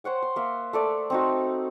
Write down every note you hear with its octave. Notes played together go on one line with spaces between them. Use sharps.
C5 C#5 F#5 G5
C6
A#3 E5
A3 A4 D5
C4 D#4 F#4